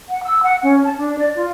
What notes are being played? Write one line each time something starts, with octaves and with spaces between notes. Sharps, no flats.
F#5
E6
F#5
C#4
A5
D4
D5
F4